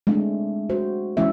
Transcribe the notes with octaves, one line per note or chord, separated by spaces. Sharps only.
G#3 A3 C4 D4
F#4 C5
E3 G#3 C#4 E4 E5